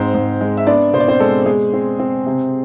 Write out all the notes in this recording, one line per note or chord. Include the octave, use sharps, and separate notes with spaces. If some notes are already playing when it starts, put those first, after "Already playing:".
Already playing: G#2 C4 C5
G#2
G#3
E5
B3 D4 D5
B2 C5
D5
C4 C5
G#3 A4
G#3 G#4
C4
C4
C3